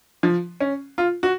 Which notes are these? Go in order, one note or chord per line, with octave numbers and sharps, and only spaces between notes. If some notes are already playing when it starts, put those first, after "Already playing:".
F3
C#4
F4
F#4